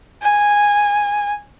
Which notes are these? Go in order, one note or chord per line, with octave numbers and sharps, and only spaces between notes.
G#5